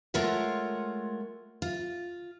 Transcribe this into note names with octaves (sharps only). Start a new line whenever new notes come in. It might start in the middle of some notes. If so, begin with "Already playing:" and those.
G#3 A3 F4 A#4 C#5 F#5
F4